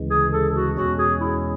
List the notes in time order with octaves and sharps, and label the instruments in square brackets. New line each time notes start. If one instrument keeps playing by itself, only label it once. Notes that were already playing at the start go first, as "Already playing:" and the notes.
Already playing: [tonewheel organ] D2 C#3 E3 G#3
[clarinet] G#4
A4
F#4
[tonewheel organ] E2 B2 G#3 C#4 [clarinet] F#4
[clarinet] G#4
E4